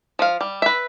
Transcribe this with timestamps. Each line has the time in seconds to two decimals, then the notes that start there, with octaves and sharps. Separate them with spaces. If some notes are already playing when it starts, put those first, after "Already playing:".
0.19 F3 F5
0.41 G3
0.62 B4 E5